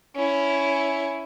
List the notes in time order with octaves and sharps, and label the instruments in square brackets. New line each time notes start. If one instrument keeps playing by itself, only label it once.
[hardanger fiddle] C#4 E4